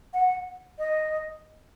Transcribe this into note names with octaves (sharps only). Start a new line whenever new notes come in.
F#5
D#5